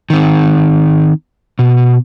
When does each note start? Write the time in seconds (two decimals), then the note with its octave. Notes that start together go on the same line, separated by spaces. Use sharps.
0.10 D#3 C4
1.59 B2